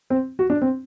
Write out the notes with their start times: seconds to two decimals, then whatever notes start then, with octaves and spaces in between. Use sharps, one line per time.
0.10 C4
0.39 F#4
0.50 D4
0.62 C4